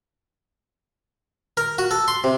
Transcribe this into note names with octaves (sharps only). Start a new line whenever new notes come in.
A#4
F#4
A4
C6
C3